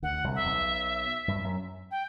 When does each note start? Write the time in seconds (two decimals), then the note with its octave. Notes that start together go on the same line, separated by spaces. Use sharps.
0.02 D2 D3 F#5
0.24 C2 C3
0.35 E5
0.44 B1 B2
1.28 G2 G3
1.43 F#2 F#3
1.91 G5